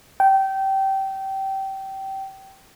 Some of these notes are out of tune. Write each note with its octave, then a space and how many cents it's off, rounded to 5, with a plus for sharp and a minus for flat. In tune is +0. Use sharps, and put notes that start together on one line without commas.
G5 -20